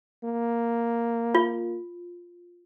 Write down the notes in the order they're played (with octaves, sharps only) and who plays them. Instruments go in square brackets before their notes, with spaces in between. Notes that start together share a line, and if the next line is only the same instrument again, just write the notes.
[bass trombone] A#3
[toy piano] F4